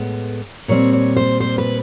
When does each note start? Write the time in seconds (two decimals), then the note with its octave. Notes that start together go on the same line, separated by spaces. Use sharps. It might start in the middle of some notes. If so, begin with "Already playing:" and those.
Already playing: A2 G#3 B3
0.68 A#2 G3 C4 C#5
0.93 C#5
1.17 C5
1.41 C5
1.58 B4